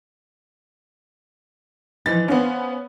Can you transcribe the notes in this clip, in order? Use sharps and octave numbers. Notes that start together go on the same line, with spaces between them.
E3 F3 D#4 A6
B3 C#4 C5 F5